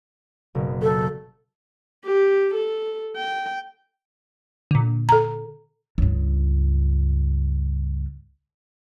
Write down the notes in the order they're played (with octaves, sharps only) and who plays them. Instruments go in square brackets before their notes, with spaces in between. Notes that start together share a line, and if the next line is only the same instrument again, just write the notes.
[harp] F#1 B2
[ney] A4
[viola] G4
A4
G5
[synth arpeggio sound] A#2 D3
[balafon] A4 A#5
[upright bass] C#2 G2